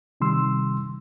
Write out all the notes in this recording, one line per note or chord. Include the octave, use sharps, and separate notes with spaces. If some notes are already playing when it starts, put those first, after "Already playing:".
C3 D#3 G3 C6 E6